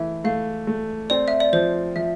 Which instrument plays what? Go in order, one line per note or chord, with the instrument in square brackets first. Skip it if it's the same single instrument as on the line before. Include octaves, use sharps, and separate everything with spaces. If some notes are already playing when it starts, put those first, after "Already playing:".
Already playing: [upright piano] E3 A3 [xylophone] E5
[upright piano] A3 [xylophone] F5
[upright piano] A3
[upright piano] C4 [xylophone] D5
[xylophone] E5
D5
[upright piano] F3 [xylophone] C5
[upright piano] F3 [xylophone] E5